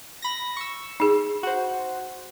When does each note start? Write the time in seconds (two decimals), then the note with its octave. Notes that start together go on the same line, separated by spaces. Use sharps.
0.22 B5 A#6
0.57 C#6 E6
1.00 D#4 G#4
1.43 F#4 C5